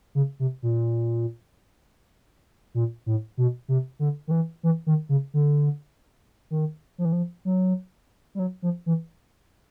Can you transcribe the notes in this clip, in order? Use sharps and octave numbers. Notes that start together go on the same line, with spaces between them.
C#3
C3
A#2
A#2
A2
B2
C3
D3
D#3
E3
E3
D#3
C#3
D3
D#3
F3
E3
F3
F#3
G3
F#3
F3
E3